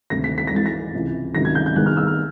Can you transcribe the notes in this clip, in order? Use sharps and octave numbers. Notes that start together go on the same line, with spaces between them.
D2 C3 D#3 A#6
B6
B6
A#6
G#1 G#2 E3 A6
A#6
C#2 C3 E3
C#2 C3 D#3 F#3 A#6
G#6
G6
G6
C2 C3 D#3 G#3 B3 F#6
F6
E6
F6